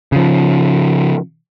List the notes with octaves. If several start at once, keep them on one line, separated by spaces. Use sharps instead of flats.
C#3 F3